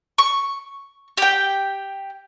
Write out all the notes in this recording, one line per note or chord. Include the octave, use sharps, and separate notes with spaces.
C#6
G4 G5